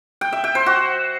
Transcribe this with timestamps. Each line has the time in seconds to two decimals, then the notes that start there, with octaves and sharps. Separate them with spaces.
0.21 G5
0.33 E5
0.44 G5
0.55 C5
0.66 F#4